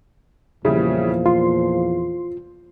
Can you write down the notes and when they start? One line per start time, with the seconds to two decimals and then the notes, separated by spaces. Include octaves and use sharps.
0.65 E2 A#2 C#3 F3 G3 E4
1.26 F4 C6